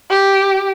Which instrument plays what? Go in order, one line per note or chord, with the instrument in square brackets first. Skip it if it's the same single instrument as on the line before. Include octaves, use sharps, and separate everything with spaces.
[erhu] G4